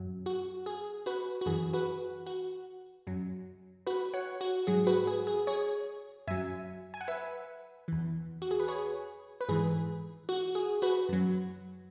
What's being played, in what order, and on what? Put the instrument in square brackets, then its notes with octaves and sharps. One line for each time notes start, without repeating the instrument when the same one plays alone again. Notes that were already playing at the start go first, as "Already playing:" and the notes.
Already playing: [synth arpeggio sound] F#2 F#3
F#4
G#4
F#4 B4
F#4
F#2 E3 G#4
F#4 B4
F#4
F#2 F#3
F#4 B4
C#5 F#5
F#4
G#2 F#3 G#4
F#4 B4
G#4
G#4
G#4 C#5
F#2 F#3 E5 G#5
G#5
F#5
B4 E5
E2 E3
F#4
G#4
B4
G#4 C#5
B4
G#2 E3 G#4
F#4
G#4
F#4 B4
F#2 F#3